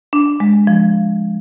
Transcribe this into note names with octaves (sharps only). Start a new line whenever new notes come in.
D4
G#3
F3